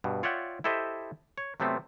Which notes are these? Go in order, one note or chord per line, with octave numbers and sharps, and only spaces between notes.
G2 B2
F4 C#5 D5 E5 F#5 G5
E4 G4 A4 C5 D#5 E5
C#5
C3 F#3 A3 B3 C4